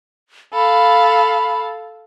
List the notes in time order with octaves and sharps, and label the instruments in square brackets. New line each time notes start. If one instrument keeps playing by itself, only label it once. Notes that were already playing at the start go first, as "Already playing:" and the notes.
[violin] A4 F5 [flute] B5